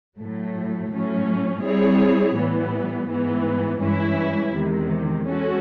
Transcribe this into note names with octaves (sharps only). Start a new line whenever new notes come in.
A2 F#3 A3
A2 F#3 A3 C#4
G3 C4 E4 G#4 C#5
A2 E3 G3 B3
G#2 E3 G#3 B3
G2 E3 G#3 C#4 E4
E2 C3 D#3 G#3
G#3 C#4 F#4 A4